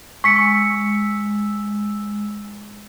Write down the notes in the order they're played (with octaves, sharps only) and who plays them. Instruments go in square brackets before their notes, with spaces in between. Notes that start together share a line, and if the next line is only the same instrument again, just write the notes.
[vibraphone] G#3 E6 [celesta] C#6 B6 C#7